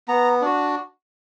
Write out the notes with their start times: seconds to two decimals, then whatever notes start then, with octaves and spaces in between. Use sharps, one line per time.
0.08 B3 A#5
0.42 D4 F#4